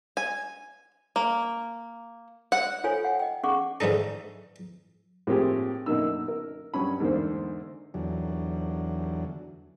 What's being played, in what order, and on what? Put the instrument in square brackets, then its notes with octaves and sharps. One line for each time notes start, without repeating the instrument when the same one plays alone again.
[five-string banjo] G#5
A#3
F#5
[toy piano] F4 A4 C5 C#5 G#5
F#5
D#5 G5
C#4 G#4 F#5 C#6 D6
[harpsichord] G#2 E3 D4 D#4 A4
[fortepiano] A2 F3 A#3 C4 G4 G#4
F#2 B2 D3 A#3 D#4 E6
A#4
G2 F#3 C#4 B5
E2 G#2 D3 A#3 C5
[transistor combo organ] E2 D3 F#3